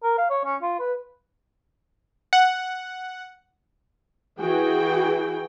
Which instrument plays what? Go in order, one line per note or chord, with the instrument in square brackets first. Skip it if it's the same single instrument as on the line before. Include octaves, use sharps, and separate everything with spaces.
[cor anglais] A#4
F5
C#5
C#4
F4
B4
[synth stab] F#5
[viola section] E3 F#4 G#4 G5